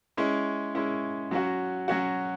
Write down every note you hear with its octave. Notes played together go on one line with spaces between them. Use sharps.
G#3 C#4 E4
G#3 C#4 E4
F#3 C#4 F#4
F#3 C#4 F#4